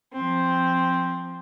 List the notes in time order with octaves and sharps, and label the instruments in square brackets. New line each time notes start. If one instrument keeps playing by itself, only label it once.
[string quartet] F3 C4